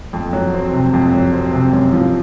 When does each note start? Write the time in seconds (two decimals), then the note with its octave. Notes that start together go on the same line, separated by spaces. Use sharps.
0.13 F2
0.33 F#3
0.54 C4
0.73 C3
0.94 F2
1.14 F#3
1.34 C4
1.53 C3
1.73 F#2
1.93 F3